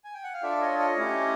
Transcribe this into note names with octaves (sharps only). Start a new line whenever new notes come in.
G#5
G5
F#5
F5
D4 F4 A4 D5 E5
C#5 D#5
C#5 D#5
A3 C#4 E4 G4